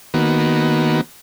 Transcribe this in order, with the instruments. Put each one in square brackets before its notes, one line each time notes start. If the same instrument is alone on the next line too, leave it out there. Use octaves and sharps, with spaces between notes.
[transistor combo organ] D#3 A#3 B3 F#4